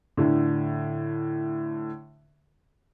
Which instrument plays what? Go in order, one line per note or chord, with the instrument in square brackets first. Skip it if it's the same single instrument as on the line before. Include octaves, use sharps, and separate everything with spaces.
[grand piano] A2 D3